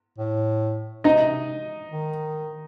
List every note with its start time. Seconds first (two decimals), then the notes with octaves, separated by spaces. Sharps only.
0.18 A2
1.04 C3 D#4 D#5
1.91 D#3